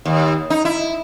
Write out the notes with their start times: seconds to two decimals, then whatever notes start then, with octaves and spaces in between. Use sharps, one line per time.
0.05 D#2
0.50 D#4
0.65 E4